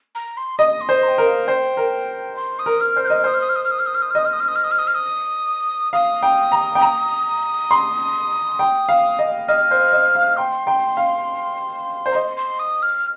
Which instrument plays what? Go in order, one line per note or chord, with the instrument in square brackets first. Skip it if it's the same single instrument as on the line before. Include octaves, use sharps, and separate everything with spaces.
[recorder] A#5
C6
[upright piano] D#5 [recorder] D#6
[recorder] C6
[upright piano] C5
[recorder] A#5
G5
[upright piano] A#4
[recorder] F5
[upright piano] C5 [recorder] G5
[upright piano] A#4
[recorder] C6
D#6
[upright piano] A#4
[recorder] F6
[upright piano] C5
[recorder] G6
[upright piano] D#5 [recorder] F6
[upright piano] C5 [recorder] D#6
[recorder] F6
D#6
F6
D#6
F6
D#6
F6
D#6
F6
D#6
F6
[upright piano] D#5 [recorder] D#6
[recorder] F6
D#6
F6
D#6
F6
D#6
F6
D#6
F6
D#6
[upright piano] F5 [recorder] D#6
[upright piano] G5
A#5
G5
A#5
C6
G5
F5
D#5
[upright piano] D#5 [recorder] F6
[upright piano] C5
D#5
F5
[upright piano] G5 [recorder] C6
[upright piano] G5
F5
C5
[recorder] A#5
[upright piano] D#5 [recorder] C6
[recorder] C6
D#6
F6